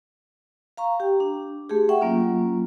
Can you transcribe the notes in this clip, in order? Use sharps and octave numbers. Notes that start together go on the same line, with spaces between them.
F5 A#5 C#6
G4 G5
D4
A3 G4 G#4
E5 F#5 G5 C#6
F#3 A#3 C#4 F4